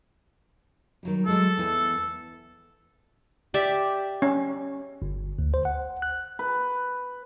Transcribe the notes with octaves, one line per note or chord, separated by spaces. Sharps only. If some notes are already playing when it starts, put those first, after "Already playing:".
D#3 F#3 G3
F#3 G#3 A3 A4
E2 E3 A5
G4 D5 E5
C#4
G1
D2
C5
F#5
F#6
B4